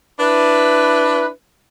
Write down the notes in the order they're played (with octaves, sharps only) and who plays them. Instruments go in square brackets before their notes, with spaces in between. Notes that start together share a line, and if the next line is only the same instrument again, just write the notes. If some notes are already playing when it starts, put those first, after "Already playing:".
[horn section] D4 E4 B4